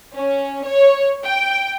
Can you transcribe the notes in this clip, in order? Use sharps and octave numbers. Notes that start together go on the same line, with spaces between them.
C#4
C#5
G5